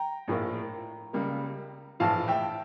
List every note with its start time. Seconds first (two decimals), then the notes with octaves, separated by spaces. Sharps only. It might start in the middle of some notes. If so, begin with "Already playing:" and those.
Already playing: G5 A#5
0.28 A#1 A2 F3 A#3
1.13 C#2 C#3 G3 A#3
2.00 A#1 A2 E3 F5 A5
2.28 E5 G5